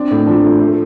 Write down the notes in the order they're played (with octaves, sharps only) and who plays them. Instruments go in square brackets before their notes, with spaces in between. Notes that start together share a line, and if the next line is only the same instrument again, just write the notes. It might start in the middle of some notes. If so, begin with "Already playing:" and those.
Already playing: [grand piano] C4 [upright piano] D4
[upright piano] A2
[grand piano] F3 [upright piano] D4
[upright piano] A3
A3